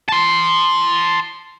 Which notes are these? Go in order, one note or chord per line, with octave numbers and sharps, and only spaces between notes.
A5 C6